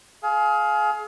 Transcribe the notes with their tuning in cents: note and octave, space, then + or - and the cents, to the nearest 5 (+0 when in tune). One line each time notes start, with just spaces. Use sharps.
G#4 +30 F5 +10